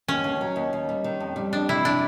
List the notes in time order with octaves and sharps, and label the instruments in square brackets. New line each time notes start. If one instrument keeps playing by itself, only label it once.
[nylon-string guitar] D#2 [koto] C#4
[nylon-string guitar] D#2
F#3
D#2
D#2
G3
D#3
F2
G3
[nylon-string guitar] F2 [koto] D4
[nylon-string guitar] C3 [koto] E4
[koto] D4